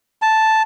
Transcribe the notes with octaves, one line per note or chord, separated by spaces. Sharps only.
A5